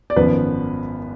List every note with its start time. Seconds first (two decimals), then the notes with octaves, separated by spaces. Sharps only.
0.10 D5
0.16 G#1 F#2 F3 B3 B4